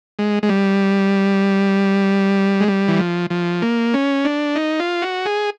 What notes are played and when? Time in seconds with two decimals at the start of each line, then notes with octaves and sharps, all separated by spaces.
0.19 G#3
0.43 G#3
0.49 G3
2.60 G#3
2.68 G3
2.88 E3
2.99 F3
3.30 F3
3.62 A#3
3.94 C#4
4.25 D4
4.56 D#4
4.80 F4
5.02 F#4
5.26 G#4